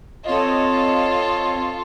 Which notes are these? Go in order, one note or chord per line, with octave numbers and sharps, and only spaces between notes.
C4 F4 A4 C#5 D#5